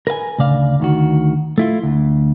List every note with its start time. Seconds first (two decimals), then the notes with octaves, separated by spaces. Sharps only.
0.07 A#4 B4 F5 G#5
0.38 D2 C#3 D5 F5
0.80 D2 D#3 F#4
1.58 A3 E4 F4
1.83 D2